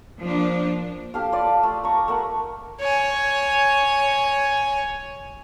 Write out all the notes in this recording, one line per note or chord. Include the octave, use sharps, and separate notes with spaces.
F3 A#3 D4
G4 A4 F5
F4 B4 D5
A3
A#5 C#6
A3 A#4 F#5
C#5 G#5